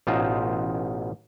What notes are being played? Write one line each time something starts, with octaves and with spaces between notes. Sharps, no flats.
A1 B2 D#4 F4 C5